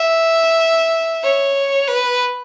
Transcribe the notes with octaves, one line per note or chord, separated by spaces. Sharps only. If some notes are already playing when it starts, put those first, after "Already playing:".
Already playing: E5
C#5
B4